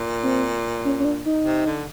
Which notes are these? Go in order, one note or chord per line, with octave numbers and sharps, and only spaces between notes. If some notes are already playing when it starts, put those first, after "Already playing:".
Already playing: A#2
C4
C#4
C#4
D4
D#4
C3
D3